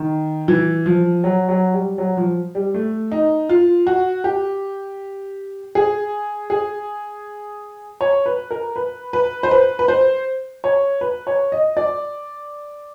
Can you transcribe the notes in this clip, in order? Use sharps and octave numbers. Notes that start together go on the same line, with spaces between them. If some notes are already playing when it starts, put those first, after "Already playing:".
Already playing: D#3
E3
F3
F#3
F#3
G3
F#3
F3
G3
A3
D#4
F4
F#4
G4
G#4
G#4
C#5
B4
A#4
B4
B4
C5
B4
B4
C5
C#5
B4
C#5
D#5
D5